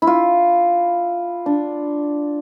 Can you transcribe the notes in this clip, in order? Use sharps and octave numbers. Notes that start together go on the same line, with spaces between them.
E4
F4
D4